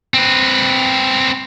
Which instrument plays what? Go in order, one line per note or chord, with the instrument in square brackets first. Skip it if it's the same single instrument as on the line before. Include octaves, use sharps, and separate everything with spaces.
[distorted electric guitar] C4 B4